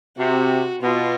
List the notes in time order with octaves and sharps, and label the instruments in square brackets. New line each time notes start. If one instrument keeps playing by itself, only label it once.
[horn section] C3 [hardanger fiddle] F#4
[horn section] B2 [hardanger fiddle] F4